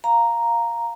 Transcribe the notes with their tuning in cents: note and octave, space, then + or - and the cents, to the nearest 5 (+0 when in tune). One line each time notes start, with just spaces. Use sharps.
F5 +0 A#5 +0